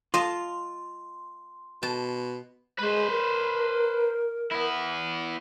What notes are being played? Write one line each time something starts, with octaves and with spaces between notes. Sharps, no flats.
F4 D#5 A5 C6
B2 A5
G#3 B4 C5
A#4
B3 E4